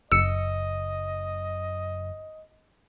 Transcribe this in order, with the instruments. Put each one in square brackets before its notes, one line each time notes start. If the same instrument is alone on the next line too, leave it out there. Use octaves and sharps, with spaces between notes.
[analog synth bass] F#1 [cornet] D#5 [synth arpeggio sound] E6 C#7